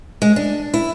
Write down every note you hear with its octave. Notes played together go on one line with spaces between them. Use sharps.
G#3
D4
E4